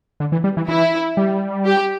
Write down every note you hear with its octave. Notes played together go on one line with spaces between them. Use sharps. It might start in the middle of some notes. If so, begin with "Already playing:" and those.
D3
E3
G3
E3
E3 E4
G3
G4